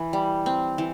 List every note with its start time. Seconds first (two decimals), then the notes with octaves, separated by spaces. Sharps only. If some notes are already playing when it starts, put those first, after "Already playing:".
Already playing: E3
0.13 G3
0.46 C4
0.78 E3